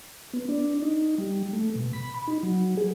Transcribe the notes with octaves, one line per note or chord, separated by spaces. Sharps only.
B3
D4
D#4
G3
A3
B2
B5
D#4
F#3
G#4